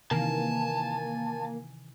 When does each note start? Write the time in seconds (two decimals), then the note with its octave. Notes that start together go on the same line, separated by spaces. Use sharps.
0.11 C3 D#3 E3 A#3 G#5 A5